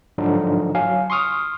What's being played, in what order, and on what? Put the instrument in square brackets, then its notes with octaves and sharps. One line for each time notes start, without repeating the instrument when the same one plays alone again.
[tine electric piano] G#2 D3 F3 F#3 D4 D#4
F#3 F5 G#5
C6 C#6 D#6 F6